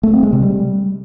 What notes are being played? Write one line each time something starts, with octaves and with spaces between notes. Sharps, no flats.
A3
C4
G#3
C3
G3